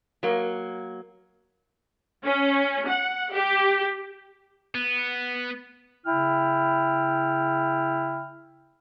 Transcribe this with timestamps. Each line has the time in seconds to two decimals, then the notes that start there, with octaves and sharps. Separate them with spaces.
0.23 F#3 A#3
2.24 C#4
2.87 F#5
3.30 G4
4.74 B3
6.06 C#3 E4 G5 F6